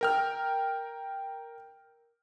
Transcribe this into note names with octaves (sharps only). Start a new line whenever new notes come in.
A#4 G5 F6